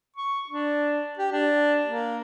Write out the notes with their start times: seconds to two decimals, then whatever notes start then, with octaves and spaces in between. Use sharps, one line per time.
0.16 C#6
0.49 D4
1.18 G4
1.32 D4
1.87 A#3